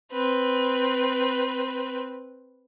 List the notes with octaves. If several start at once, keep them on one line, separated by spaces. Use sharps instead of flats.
C4 B4